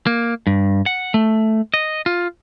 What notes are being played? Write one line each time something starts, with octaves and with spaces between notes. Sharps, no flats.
A#3
G2
F#5
A3
D#5
F4